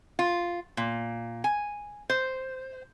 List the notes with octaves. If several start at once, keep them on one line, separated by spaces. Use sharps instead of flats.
F4
A#2
G#5
C5